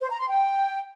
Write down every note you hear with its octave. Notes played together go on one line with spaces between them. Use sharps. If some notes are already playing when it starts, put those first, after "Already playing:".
C5
A#5
C6
G5